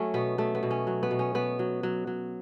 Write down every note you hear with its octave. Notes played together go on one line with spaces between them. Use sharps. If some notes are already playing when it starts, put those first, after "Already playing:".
Already playing: F#3 A3 C#4
B2 B3
F#3 A3
B3
B2
C#4
F#3
B3
B2
C#4
B2 B3
F#3
F#3
F#3